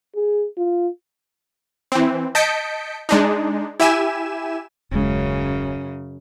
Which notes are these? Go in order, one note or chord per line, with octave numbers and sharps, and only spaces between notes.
G#4
F4
E3 C4
D#5 A5 G6 B6 C#7 D7
G#3 D4 D#4
E4 G4 E5 G#5 E7
D#1 F#2 C#3 G#3